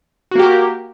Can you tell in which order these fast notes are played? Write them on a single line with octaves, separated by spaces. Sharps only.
F#4 A#3 G4 A#4